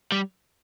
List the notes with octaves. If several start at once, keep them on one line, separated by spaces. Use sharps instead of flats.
G3